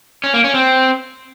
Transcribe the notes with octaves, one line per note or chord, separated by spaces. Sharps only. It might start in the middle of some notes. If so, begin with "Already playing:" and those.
C#4
A#3
C#4
C4